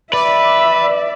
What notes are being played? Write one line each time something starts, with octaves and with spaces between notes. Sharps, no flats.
B4 D5 E5